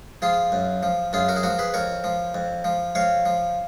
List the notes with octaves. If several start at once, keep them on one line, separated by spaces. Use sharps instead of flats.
F3 F4 G#4
F#2
F3
F#2 F4 G#4
F#4 A#4
G#4
F3 F#4 A#4
G#4 B4
F2 A#4 C#5
F3
F2
F3
F2 C#5 F5
F3